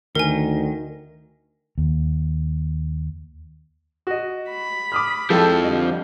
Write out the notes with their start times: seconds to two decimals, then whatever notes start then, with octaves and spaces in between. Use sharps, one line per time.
0.15 D2 D#3 A#4 G#5
1.78 D#2
4.07 F#4 D#5
4.51 B5
4.92 D6 D#6 F6
5.30 F2 F3 G#3 E4 A4 G5 A5
5.64 D3 G3 D#5